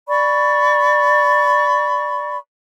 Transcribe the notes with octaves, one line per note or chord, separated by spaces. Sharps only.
D5 B5 C#6